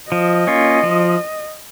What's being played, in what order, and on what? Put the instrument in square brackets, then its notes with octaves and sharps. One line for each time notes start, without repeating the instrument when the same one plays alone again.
[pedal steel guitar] F3 [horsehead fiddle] D#5
[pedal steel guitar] A#3 C#4 F4
F3